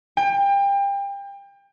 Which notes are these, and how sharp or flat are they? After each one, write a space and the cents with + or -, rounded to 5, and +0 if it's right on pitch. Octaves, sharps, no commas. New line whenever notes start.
G5 +30